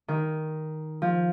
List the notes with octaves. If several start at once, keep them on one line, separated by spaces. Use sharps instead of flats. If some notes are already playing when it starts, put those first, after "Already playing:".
D#3
F3